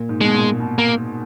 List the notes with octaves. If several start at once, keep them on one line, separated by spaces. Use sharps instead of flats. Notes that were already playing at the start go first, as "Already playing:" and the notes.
Already playing: A#2
G#2
B2 G#3
A#2
B2
A#3